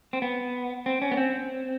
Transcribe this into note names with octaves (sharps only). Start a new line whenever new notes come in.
C4
B3
C4
C#4
B3
C4